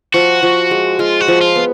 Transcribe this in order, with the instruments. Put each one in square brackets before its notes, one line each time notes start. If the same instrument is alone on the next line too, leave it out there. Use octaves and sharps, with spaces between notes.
[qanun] F3 [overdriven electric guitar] F#4
[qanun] F3
G#3
[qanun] G#3 [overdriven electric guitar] F4
[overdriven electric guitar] F#4
[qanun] F3
[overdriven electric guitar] F4
[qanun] B3